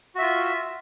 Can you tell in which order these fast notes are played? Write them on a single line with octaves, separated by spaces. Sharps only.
F#4 E5 F4